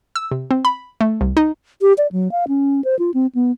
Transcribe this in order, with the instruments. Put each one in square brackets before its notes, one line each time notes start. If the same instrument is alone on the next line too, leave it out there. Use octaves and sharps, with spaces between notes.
[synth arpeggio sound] E6
C3
C4
B5
A3
C2
D#4
[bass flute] G4
D5
F#3
F5
C#4
C5
F4
C4
B3